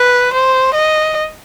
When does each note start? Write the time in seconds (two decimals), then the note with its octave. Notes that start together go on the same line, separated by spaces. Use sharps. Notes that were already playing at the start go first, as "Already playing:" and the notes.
Already playing: B4
0.33 C5
0.74 D#5